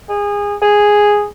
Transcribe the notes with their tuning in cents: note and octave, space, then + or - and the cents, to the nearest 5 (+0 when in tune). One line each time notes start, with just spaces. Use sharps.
G#4 -25
G#4 -5